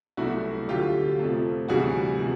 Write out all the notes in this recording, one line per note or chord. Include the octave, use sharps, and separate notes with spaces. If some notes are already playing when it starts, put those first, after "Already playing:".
C2 B2 F#3 A3 E4 F#4
D2 D3 F#3 F4 G4
F2 C3 F3 A3
D2 C3 E3 G3 F#4 G#4
C3 F3 G#3